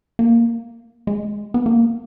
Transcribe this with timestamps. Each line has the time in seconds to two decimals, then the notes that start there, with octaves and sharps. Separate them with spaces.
0.19 A#3
1.07 G#3
1.54 B3
1.66 A#3